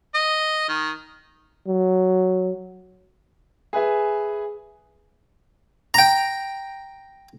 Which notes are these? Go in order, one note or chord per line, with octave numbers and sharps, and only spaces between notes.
D#5
D#3
F#3
G#4 B4 E5 G#5
G5 A#5